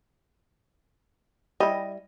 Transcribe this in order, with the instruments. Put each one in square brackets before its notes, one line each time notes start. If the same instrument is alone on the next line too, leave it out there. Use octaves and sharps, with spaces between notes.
[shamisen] G3 E4 [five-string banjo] D#5